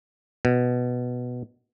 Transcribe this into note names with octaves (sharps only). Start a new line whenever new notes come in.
B2